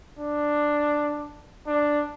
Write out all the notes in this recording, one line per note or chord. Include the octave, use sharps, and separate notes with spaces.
D4
D4